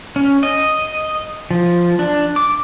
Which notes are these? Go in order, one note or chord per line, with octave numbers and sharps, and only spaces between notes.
C#4
D#5
F3
D4
D6